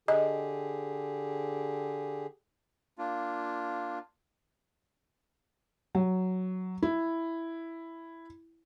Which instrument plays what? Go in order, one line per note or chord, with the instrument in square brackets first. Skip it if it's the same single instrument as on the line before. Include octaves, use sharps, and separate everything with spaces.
[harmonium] D3 G4 G#4 [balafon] D#5
[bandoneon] A#3 D4 F4
[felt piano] F#3
E4